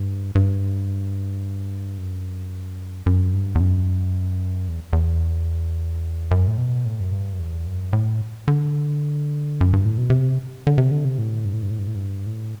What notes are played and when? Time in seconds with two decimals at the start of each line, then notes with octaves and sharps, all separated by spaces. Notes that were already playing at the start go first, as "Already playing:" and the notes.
Already playing: G2
0.35 G2
1.98 F#2
3.06 F#2
3.33 G2
3.55 E2
3.60 F#2
4.68 E2
4.93 E2
6.31 F#2
6.48 A2
6.58 B2
6.85 A2
7.00 F#2
7.12 G2
7.33 F#2
7.39 E2
7.67 F#2
7.93 A2
8.48 D3
9.61 F#2
9.73 G2
9.85 A2
9.98 B2
10.10 C3
10.67 D3
10.78 C3
10.91 D3
11.05 C3
11.18 A2
11.45 G2
11.53 A2
11.62 G2
11.71 A2
11.79 G2
11.87 A2
11.95 G2
12.26 A2